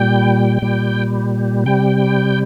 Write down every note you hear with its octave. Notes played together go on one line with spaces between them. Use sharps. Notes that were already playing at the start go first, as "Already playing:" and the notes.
Already playing: A#2 G3 G5
A#2 G3
C3 G3 G5